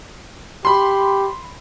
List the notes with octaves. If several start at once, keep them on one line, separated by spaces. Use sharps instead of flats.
G4 B5 C6